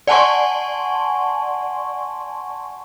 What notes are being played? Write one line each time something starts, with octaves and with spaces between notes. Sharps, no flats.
D5 F#5 G#5 A5 C6 C#6